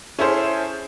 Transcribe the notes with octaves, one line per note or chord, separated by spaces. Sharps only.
C#4 E4 G#4 A4 C5